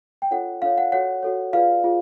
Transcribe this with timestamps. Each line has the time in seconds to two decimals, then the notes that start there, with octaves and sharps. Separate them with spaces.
0.22 G5
0.31 D4 F4 A4 C#5 F#5
0.62 D4 F4 A4 C#5 F5
0.78 F#5
0.92 F#4 A4 C#5 F#5
1.23 F#4 A4 C#5
1.53 F4 G#4 B4 D5 F5
1.84 F4 G#4